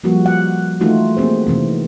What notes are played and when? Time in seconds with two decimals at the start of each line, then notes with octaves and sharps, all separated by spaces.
0.04 F3 G3 A#3 F#4
0.26 F#5
0.81 D#3 E3 A3 D#4 F4 F#4
1.17 A#3 C4 G#4 C5
1.47 C3 D#3 E3 C4